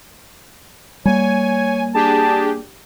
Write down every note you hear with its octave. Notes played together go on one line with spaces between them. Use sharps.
G3 A#3 C#5 G#5
D4 G4 G#4 A5